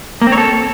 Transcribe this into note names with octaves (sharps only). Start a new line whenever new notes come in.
A#3
C4
C#5
A4